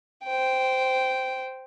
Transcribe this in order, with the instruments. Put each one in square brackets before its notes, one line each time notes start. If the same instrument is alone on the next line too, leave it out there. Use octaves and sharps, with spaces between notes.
[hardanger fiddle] C5 G5